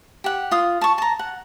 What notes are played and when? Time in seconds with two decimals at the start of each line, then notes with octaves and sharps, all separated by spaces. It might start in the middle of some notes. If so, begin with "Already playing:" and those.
0.24 G4 F#5
0.51 F4 D#6
0.81 A5 C#6
0.98 A5 A#5
1.19 F#5